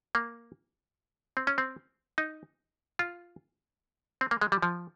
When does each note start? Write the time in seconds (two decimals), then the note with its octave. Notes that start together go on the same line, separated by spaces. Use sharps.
0.15 A#3
1.37 C4
1.47 C#4
1.58 C4
2.18 D#4
2.99 F4
4.21 C4
4.31 A#3
4.41 G#3
4.52 G3
4.62 F3